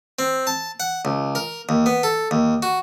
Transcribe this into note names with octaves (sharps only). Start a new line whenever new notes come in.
C4
A5
F#5
C#2
A#4
D#2
B3
A4
D#2
F#4